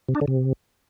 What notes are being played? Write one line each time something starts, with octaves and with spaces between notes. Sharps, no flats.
C3
D4
D3
C3